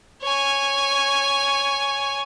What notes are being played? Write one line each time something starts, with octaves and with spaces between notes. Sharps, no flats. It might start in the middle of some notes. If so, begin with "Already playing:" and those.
C#5 G#5